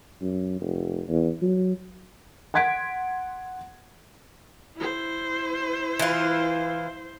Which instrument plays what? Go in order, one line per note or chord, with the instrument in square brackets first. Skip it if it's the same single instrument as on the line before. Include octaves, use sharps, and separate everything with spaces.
[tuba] F#2
F1
E2
F#3
[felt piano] F#5 C6 G#6 B6 D7
[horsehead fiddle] E4 C5
[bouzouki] E3 F4